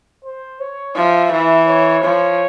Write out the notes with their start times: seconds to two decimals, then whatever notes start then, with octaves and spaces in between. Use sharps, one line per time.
0.24 C5
0.60 C#5
0.95 F3 E5
1.32 E3
1.68 C#5
2.03 F3 C#5